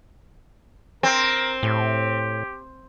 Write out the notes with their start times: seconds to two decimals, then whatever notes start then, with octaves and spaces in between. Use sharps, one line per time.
1.03 C4 A#4
1.63 A2 G4